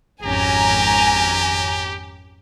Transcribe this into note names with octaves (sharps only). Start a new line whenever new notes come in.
G#1 F2 C#4 G4 G#5 A#5